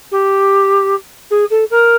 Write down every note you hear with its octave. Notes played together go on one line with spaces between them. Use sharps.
G4
G#4
A4
A#4